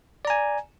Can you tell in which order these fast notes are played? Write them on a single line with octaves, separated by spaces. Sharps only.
D5 A#5 G#5